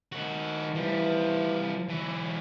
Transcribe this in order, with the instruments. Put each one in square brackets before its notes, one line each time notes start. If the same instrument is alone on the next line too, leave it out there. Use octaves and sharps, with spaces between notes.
[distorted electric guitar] D#3 F#4
[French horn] E3 [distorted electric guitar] F3 G3
[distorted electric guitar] E3 F#3